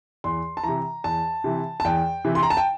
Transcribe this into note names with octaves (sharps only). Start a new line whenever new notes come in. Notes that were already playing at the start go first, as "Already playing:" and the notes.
E2 C6
A5
C3 E3 A#5
E2 A5
C3 E3
A5
E2 G5
C3 E3
C6
A#5
A5
G5